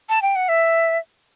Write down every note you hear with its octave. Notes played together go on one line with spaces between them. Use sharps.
A5
G5
F#5
E5